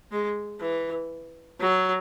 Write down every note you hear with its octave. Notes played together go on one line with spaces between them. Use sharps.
G#3
E3
F#3